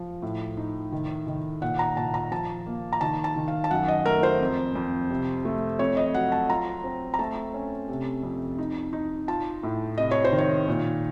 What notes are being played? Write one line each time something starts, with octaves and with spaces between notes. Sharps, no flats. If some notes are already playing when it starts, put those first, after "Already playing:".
Already playing: F3
A2
D#4
D#3
D#3
A#2 F#5
A#5
A#2 A5
A#5
F3 A5
A#3
A#5
D#3 A5
A5
D#3
F5
A5
F#2 F#5
D#5
A3 A#4
C5
F2
F2
C3
A3
F2 C#5
D#5
F#3 F#5
A5
F4 A#5
C4
A#5
A3 A5
C#4
C3
F2
D#4
D#4
F4 A5
A2
C3 D#5
C#5
C5
D#3
C#5
A#2